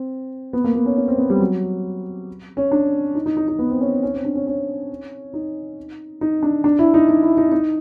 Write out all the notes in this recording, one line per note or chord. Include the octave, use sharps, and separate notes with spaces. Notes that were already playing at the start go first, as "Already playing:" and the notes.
Already playing: C4
B3
A#3
B3
C#4
C#4
C4
B3
G3
F#3
C#4
D4
D#4
D#4
D#4
D#4
B3
C4
C#4
C#4
C4
D4
C#4
C#4
D#4
D#4
D4
D4
E4
D#4
D#4
E4
D#4
D#4